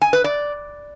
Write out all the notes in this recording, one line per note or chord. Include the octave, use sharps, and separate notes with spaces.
G#5
B4
D5